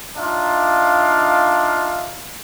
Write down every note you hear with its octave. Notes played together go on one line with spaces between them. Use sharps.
D4 D#4 F4 E5 F5